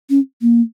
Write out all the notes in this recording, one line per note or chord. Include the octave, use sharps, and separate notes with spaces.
C#4
A#3